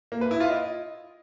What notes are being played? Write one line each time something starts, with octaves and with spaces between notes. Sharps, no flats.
A#3
B4
E4
F4
D#5